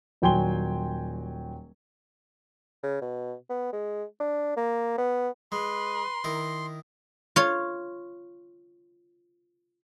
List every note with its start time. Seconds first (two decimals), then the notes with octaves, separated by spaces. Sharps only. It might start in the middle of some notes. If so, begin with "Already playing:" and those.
0.22 D#1 F#3 G5 G#5 C6 G7
2.83 C#3
3.01 B2
3.49 B3
3.73 G#3
4.20 D4
4.57 A#3
4.98 B3
5.52 G#3 B4 C6
6.24 D#3 E4 A#4
7.36 F4 C#5